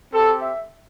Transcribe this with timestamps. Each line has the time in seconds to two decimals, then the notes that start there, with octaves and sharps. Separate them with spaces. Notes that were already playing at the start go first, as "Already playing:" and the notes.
0.13 C4 G4 A4
0.41 E5